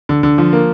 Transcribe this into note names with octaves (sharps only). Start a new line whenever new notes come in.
D3
D3
F3
A#3